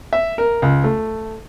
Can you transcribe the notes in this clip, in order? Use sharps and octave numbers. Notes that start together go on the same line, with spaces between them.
E5
A#4
C#2
A3